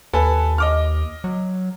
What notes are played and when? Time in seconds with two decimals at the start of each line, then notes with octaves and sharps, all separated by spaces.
0.13 D#2 A4 B4 G#5
0.58 D#5 D6 F6
1.24 F#3